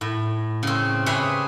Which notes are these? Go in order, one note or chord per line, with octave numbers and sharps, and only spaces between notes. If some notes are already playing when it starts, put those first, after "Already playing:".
A2
C#3 C4
G4 G#4 B4 C#5 E5